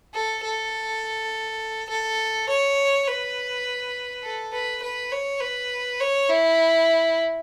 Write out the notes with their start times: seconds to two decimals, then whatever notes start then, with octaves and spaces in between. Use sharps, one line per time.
0.14 A4
0.44 A4
1.89 A4
2.49 C#5
3.08 B4
4.23 A4
4.53 B4
4.82 B4
5.12 C#5
5.41 B4
6.00 C#5
6.29 E4